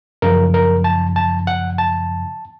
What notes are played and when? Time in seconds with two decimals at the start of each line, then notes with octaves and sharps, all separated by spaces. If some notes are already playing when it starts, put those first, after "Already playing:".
0.22 F#2 C#3 F3 A#4
0.54 A#4
0.84 A5
1.16 A5
1.47 F#5
1.78 A5